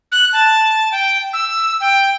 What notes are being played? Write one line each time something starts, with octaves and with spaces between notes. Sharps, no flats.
F#6
A5
G5
E6
G5